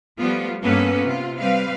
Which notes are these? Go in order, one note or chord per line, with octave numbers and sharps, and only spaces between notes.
F3 G3 A3 B3 F4
G2 A#3 B3 C#4 A4 B4
C3 F4
G3 C4 B4 F5